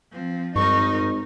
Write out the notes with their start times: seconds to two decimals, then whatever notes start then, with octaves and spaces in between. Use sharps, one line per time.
0.12 F3 C4
0.56 G#1 G2 D#4 A#4 C#6